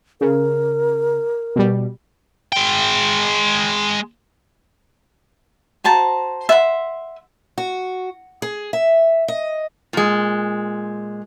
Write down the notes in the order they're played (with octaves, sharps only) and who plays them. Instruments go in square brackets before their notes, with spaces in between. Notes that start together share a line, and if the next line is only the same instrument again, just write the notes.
[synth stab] C#3 [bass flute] A#4
[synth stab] B2 G3
[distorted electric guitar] G#3 G5
[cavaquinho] F#4 C5 A5 A#5
E5 F#5 C6
[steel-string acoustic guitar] F#4
G#4
E5
D#5
[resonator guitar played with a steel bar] A#2 G#3